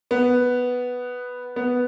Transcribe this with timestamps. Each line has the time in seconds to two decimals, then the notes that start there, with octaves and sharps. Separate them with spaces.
0.11 B3
1.56 B3